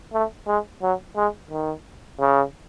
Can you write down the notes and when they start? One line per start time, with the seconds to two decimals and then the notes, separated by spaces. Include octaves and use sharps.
0.13 A3
0.47 G#3
0.83 F#3
1.16 G#3
1.51 D#3
2.20 C#3